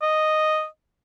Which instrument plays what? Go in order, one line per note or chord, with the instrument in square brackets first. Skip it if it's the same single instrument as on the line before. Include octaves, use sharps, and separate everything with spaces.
[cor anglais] D#5